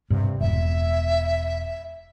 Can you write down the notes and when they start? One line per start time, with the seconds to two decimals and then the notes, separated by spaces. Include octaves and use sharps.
0.10 G2 C3
0.40 E1 E5